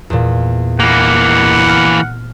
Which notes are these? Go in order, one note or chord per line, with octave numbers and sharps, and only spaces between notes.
E2 A#2
E3 A#3 F#5
F6